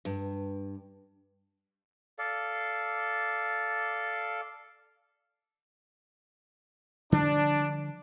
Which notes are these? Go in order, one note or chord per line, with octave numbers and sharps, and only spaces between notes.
G2
A4 D5 F5
D3 F3 G3 D4